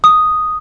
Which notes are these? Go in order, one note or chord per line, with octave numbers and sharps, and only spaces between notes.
D#6